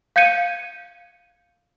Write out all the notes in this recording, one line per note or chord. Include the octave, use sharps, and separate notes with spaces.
F5 G6 G#6 C#7 D#7